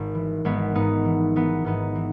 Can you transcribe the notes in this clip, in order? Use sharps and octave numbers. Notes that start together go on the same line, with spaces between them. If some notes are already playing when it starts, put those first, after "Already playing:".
Already playing: G#1
E3
G#1 G#3 B3
G#2 B3 D#4
E3
E3 B3 D#4
G#2 B3 D#4
E3